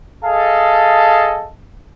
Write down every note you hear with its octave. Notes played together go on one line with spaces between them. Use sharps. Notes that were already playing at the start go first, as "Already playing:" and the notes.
G#4 A4 D#5 F5 A5